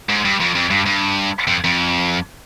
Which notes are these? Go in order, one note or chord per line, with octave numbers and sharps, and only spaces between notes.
G#2
G2
F2
F2
G2
G2
F2
F2